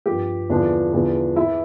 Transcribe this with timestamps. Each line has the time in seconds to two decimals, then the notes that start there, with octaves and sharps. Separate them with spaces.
0.06 G2 F3 G4
0.50 E2 D3 F3 D4
0.93 E2 D3 F3
1.36 E3 E4